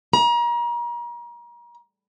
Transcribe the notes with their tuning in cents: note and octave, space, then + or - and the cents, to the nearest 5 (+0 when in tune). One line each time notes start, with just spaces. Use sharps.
A#5 +35